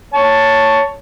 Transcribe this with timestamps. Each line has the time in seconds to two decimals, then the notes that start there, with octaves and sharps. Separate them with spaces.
0.14 C#5 A5